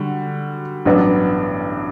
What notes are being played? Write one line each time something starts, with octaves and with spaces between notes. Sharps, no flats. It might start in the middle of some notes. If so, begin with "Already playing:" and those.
Already playing: D3 G3 F#4
A1 G2 F#3 B3 D4